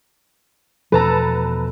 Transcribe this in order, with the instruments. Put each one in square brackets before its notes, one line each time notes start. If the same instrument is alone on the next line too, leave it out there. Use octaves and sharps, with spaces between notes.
[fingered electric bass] E2 B2 F3 [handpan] A4 [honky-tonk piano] B4 A5 A#5